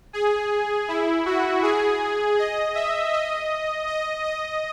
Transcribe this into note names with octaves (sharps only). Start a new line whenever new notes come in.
G#4
E4
F#4
G#4
D#5
E5
D#5
D#5
D#5